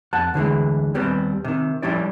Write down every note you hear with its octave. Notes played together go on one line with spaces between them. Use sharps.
F2 F#5 A5
D2 D3 E3 G#3
D#2 G3 B3 C4
C3 D#3
F3 G3 C#4 E4 D5